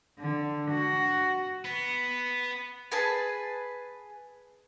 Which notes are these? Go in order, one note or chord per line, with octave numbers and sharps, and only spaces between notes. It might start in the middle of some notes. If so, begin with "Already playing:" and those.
D3
F#4
B3
G#4 B4 G#5 A5